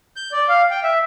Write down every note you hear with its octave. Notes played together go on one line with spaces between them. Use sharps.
G6
D5
F5
G5
E5